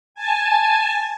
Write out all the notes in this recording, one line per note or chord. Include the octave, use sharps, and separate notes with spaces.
G#5 A5